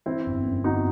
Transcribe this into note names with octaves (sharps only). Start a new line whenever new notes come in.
E3 C4 E4
G1
F#2
G1 D#4 F#4